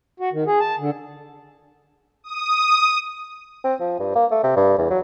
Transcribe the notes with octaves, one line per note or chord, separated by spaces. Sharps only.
F#4
D#3
G#4
A5
D3
D#6
C4
F3
G2
A#3
A3
C3
G2
E2
F#3